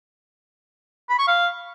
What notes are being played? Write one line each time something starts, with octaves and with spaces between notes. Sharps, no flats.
B5
C#6
F5